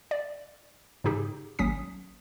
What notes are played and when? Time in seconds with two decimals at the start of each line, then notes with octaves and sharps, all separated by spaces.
0.11 D5
1.04 G#2 C#3 D#4 G4 G#4
1.59 G#1 F#3 A#3 C#4 D#6 B6